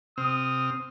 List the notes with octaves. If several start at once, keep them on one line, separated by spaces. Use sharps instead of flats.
C3 C4 D#6 F6